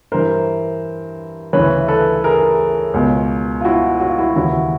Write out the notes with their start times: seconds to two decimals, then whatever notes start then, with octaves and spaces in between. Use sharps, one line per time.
0.12 G2 E3 A#4 C5
1.53 D2 C#3 E3 B4 C#5
1.88 A4 B4
2.24 G#4 A#4
2.94 C#2 B2
3.61 F4
3.65 E4 F#4
4.00 F#4
4.09 F4
4.18 E4 F#4
4.36 D#2 C#3 E3 E4 F#4